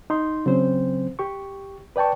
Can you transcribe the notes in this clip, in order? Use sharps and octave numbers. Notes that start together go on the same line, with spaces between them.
D#4 C6
C#3 F#3 C4 C5
G4 C#6
B4 D5 G5 A5 C#6